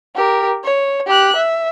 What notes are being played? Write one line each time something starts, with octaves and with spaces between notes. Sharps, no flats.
G4 A#4
C#5
G4 F#6
E5